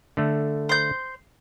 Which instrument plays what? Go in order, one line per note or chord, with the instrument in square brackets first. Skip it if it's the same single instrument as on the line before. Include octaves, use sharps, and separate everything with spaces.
[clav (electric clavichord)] D3 A3
[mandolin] C5 G6